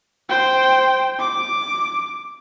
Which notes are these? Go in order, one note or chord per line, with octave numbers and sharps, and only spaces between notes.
C5 G5
D6